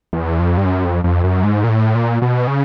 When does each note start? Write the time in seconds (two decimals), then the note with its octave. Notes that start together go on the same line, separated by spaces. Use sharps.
0.13 E2
0.39 F2
0.57 G2
0.65 F#2
0.84 F2
1.04 F2
1.24 F#2
1.44 G#2
1.64 A#2
1.69 A2
1.95 A#2
2.22 B2
2.47 C#3